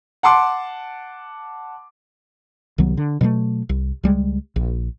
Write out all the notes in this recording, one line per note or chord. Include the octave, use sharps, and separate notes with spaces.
F#5 A5 C6 D6
C2 D#3 F#3 B3
D3
B2 F#3 G3 A3
C2
C#2 G3 G#3
A#1